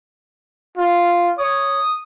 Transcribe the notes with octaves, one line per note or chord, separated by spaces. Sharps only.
F4
C#5 D#6